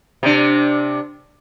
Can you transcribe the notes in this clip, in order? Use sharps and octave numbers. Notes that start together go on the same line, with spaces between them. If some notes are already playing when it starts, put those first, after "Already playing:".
C3 D4